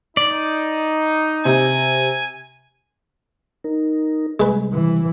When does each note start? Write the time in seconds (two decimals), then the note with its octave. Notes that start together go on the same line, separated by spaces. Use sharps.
0.17 D#4 D5
1.45 C3 G#5
3.64 D#4 A#4
4.40 C3 G3 G#3 B4
4.72 E3